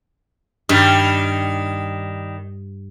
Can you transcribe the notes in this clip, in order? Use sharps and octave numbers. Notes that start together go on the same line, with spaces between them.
G2 D#3 G3